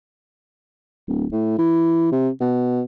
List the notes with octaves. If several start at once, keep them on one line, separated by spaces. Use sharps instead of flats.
D1
A2
E3
C3
B2